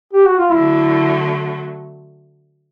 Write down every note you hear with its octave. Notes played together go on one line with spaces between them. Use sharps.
G4
F#4
F4
D3 F#3 A3 E4